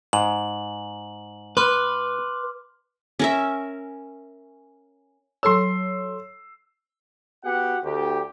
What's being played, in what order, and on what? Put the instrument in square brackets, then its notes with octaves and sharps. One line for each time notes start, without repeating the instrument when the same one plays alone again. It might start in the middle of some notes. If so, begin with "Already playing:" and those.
[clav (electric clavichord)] G#2 [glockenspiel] F#7
[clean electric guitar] B4 [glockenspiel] C6 D6 F6
[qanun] C#4 A#4 E5
[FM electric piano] F#3 A4 C#5 [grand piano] C6 E6
[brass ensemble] B3 F#4 G4 F#5
D2 G4